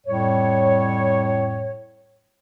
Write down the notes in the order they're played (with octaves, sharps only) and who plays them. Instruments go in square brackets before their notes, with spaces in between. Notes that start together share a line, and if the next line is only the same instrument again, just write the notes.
[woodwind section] F2 A2 G3 C#5